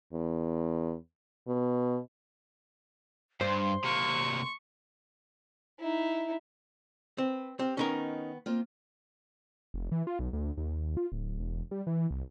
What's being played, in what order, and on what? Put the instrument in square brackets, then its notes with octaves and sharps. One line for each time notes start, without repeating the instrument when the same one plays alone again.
[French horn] E2
B2
[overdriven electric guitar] G2 [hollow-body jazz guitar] C5 [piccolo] C6
[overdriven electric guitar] C3 A#3 [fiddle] C#6
[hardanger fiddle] D#4 E4
[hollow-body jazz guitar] C4 [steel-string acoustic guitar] B4
[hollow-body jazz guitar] C4 [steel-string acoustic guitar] G4 F5
[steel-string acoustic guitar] D#3 B3 [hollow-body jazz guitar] C#4 D#4 A#4
[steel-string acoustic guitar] A#3 C4 F4
[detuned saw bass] F1
E3
F4
B1
D2
D#2
F4
D1
E1
G3
E3
C2